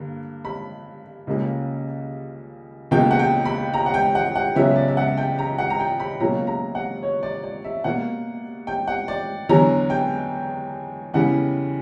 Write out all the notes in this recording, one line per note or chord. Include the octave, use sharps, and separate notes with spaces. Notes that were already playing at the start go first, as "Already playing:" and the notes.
Already playing: G2 D3 A#3
B5
C#2 C#3 G3 A#3
C#2 B2 A#3 G5
F#5
G5
B5
A#5
F#5
G5
F#5
F#5
C#2 C#3 F#3 B3 E5
D5
E5
F#5
G5
A#5
F#5
A#5
G5
B5
C#2 B2 F#3 A#3 A#5
A#5
F#5
C#5
D5
D5
E5
B2 A#3 F#5
G5
F#5
D5
E2 D3 F#3 B3 A#5
G5
E2 C#3 E3 G3 F#5